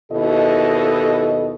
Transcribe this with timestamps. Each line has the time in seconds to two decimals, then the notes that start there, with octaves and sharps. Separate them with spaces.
0.12 D#2 B2 E4 A4 D#5